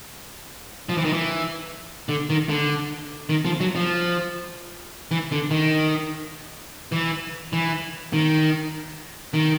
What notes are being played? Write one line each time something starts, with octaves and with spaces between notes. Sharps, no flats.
F3
E3
D#3
E3
D3
D#3
D3
D#3
F3
F#3
F3
E3
D3
D#3
E3
E3
D#3
D#3